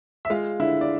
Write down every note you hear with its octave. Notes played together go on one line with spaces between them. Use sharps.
E5
G#3 F4 F5
D3 E4 E5
D5